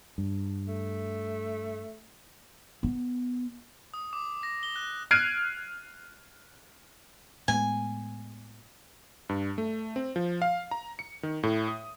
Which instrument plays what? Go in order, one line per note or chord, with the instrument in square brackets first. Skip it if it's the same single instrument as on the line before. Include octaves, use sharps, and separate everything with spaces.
[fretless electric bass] G2
[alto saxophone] A3
[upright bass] B3
[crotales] D#6
D6
A#6
G7
F#6
[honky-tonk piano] F6 F#6 G#6 C7 D7 D#7
[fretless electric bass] A2 G#3 B3 [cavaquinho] G#5
[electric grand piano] G2
A3
C4
F3
F5
A#5
C#7
D#3
A2
D#6